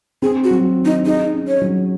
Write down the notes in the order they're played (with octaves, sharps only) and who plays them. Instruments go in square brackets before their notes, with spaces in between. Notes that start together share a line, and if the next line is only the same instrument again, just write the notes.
[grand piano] C4 [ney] G#4
[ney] F#4
[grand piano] F#3
D#3
[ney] D#4
[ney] D#4 [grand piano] G#4
[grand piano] C#4
[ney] C#5
[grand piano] F#3